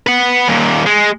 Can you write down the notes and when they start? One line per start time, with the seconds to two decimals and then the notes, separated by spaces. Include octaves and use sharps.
0.07 B4 F#5
0.48 D#2 A#2
0.86 G#3